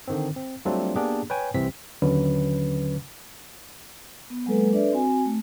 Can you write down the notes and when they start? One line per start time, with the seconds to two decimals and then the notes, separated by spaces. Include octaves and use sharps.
0.08 D3 D#3 C4
0.36 C4
0.65 F#3 G3 A3 C4 D4 F4
0.96 A#3 B3 D4 G4 G#4
1.30 B4 C#5 G5 G#5
1.54 C2 C3 E3 C4 B6
2.02 D#2 D3 F#3 C#4 B4
4.30 B3
4.46 F#3 G#3 A#3 A4 B4
4.73 D4 A4 B4 D5 E5
4.93 C4 F#4 G#5
5.25 A3